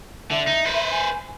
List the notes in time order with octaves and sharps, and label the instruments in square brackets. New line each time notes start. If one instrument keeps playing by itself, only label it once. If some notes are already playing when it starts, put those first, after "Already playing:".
[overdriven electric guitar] D3 [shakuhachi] E5
[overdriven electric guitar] D#4
B4 C5
[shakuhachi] G#5